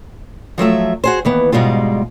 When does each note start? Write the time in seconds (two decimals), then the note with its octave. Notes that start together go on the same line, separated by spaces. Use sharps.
0.58 F3 F#3 A3 E5
1.04 F#4 G#4 C5
1.25 D#2 E3 B3
1.52 G#2 B2 G3 G#3 F4